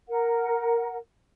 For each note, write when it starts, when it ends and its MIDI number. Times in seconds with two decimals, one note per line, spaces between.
0.09 0.97 70
0.09 0.97 78